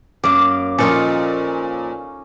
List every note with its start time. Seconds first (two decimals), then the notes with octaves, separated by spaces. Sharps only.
0.24 F#2 A#3 D6
0.78 A#2 F3 C#4 D#4 F4 A4